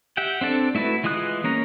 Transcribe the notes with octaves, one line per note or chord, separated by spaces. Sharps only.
G4 E5 F#5 G5
C4 D4 A4
A3 E4 F#4 B4
E3 G#3 F4 D#6 F#6
A#3 C#4 A#5